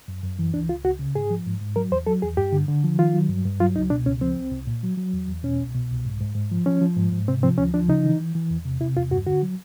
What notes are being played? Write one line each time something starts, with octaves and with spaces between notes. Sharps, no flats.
F#2
F#2
E3
C#2 D4
C#2 F4
C#2 F#4
C#3
G#2 G#4
F3
G#2
G#2
F#3 A#4
E2 C5
F#3 A4
E2 G#4
G2 G4
D3
D3
F3
D#3 F4
F#3
G2
G2
F#3 F4
C#2 D#4
B2 D4
C#2 C#4
F3 C4
C2
C2
A#2
F#3
F#3
E2
E2
B2 C#4
C2
B2
C2
G#2
G#2
G#2
F3
F3 C#4
F3
G#2
G#2
C3 C4
F3 C4
D2 C#4
F3 D4
C#3 D#4
E3
E3
E3
E2
C3
C3 E4
E2 F4
G2 F#4
D3 F#4
F#3